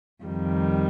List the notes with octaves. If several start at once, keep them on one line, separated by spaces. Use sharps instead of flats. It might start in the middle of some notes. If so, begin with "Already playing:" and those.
F2 D#3 G3